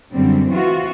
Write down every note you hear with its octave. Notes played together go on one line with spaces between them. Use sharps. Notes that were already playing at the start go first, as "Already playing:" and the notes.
F#2 D3 G3 C4
E3 C4 F4 F#4